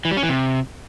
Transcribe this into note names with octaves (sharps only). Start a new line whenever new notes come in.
E3
G3
C#4
E3
C3